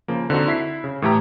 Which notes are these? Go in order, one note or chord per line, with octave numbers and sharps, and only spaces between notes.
C#3 F3 A#3
D3 C4 D#4 F#4
E4 B6 C7
C#3
A2 E3 A3 G4 A#5